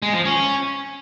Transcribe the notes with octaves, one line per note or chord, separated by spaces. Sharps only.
G#3
F3
C#4